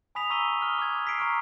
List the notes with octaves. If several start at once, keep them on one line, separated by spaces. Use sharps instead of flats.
G#5 B5 D#6 B6 F7
A#5 C#6 E6 B6 D#7 G7
D#6 F6 G7
D6 F6 G#6
C#6 E6 B6 C7 D7
A#5 C#6 D6 F6 C7